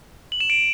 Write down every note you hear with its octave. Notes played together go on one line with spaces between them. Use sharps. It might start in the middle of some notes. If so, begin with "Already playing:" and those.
F#7
E7
D7